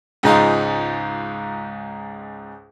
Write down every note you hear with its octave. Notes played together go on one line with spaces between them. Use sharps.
C#2 G#2 D#4 F4